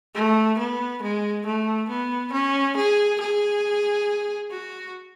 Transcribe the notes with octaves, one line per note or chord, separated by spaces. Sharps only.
A3
B3
G#3
A3
B3
C#4
G#4
G#4
F#4